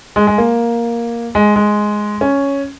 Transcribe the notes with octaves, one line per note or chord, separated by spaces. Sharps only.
G#3
G#3
A#3
G#3
G#3
C#4